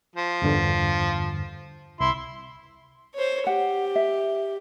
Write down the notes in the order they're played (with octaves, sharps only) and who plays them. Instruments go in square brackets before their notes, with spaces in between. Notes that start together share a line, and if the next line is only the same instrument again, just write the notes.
[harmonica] F3
[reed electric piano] E2 G2 D3
[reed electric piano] C2 [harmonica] E4 C6
[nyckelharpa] C5 C#5
[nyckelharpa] G4 [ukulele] F#5
[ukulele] E5